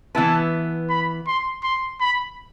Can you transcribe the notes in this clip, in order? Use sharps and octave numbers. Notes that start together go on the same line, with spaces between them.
E3 B3 E4 B4 A5
B5
C6
C6
B5